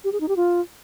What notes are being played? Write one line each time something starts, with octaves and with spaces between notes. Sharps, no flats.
G4
G#4
D#4
G4
F4